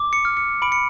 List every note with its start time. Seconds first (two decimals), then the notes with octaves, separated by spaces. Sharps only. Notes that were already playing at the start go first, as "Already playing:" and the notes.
Already playing: D6
0.13 C#7
0.25 F6
0.37 C#7
0.62 B5 D7
0.72 C#7